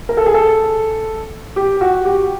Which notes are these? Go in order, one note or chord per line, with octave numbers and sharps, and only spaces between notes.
A#4
A4
G#4
A4
G4
F#4
G4